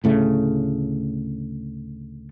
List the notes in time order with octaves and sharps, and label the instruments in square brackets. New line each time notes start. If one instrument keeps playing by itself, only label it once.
[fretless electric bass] D2 A2 C#3 A3